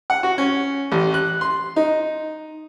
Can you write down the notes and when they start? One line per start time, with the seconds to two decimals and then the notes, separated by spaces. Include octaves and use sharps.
0.10 F#5
0.23 F#4
0.38 C#4
0.92 A1
1.14 F#6
1.41 C6
1.76 D#4